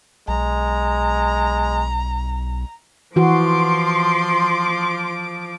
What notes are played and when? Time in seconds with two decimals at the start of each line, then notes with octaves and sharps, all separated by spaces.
0.28 B1 G#3 A#5
3.16 E3 F3 F#4 C6 D6